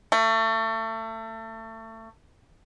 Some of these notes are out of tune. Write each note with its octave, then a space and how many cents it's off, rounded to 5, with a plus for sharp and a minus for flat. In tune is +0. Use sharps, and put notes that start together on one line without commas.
A3 +30